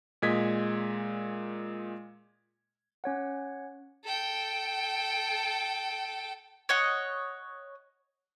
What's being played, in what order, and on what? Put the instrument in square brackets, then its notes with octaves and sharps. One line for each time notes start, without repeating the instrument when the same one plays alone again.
[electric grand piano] A#2 G#3 D#5 G#6 B6
[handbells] C#4 C#5 F#5
[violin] A4 G5
[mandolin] C#5 D#5 F#5